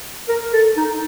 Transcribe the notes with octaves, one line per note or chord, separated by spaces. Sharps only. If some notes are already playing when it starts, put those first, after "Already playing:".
A#4
A4
D#4